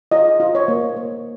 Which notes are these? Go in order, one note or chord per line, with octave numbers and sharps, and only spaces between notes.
F4 D#5
F4
C#5
A#3
A#3